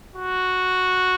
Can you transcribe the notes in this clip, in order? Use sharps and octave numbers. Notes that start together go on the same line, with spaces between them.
F#4